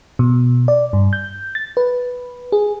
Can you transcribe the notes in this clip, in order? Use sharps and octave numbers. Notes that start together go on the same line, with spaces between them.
B2
D5
G2
G6
A6
B4
G#4